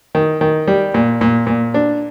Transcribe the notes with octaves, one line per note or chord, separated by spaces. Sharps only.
D#3
D#3
G3
A#2
A#2
A#2
D4